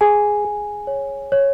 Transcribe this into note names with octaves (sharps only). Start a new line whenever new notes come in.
G#4 G#5
G#4
C#5
C#5